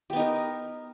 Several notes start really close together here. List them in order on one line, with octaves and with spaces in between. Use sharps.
G4 B3 D#4 A#4